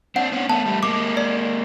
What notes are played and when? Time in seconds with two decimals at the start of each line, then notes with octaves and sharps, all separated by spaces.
0.16 C4 D4 F#5
0.32 B3 C#4
0.49 A3 B3 A5
0.66 G3 A3
0.83 G#3 A#3 D6
1.17 D5